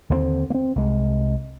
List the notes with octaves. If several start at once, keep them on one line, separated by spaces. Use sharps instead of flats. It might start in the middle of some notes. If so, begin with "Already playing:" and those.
D#2 D3 E3 C4
A#3 C4
C2 G#3